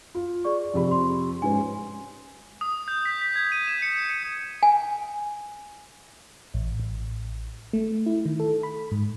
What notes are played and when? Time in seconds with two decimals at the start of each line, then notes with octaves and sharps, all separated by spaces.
0.15 F4
0.44 G#4 D5 C#6
0.74 F2 C3 B5
0.91 C6
1.42 G#2 C#4 B4 G#5
2.61 D#6
2.88 G6
3.05 B6
3.22 B6
3.36 G#6
3.52 D#7
3.67 E7
3.82 C#7
4.09 C#7
4.63 G#5
6.54 A1
6.80 A1
7.73 A3
8.06 E4
8.26 D#3
8.40 A4
8.63 B5
8.91 G#2